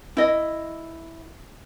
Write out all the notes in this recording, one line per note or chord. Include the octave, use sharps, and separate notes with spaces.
E4 D#5